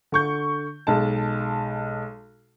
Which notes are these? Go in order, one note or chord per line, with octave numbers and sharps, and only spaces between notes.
D3 C#6 G6
B1 G#3 A5